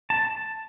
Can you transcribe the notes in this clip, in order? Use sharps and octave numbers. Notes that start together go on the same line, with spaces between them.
A5